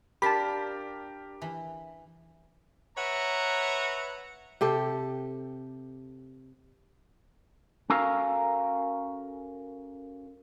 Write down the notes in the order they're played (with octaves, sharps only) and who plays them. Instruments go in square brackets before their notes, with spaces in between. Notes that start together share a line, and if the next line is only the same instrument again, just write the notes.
[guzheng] D4 F4 [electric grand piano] G4 A#4 [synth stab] A5 B5
[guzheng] E3
[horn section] B4 C#5 E5 F#5 A#5
[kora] C3 G4 A4
[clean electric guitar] C#4 F#4 A4 A#4 F5 A#5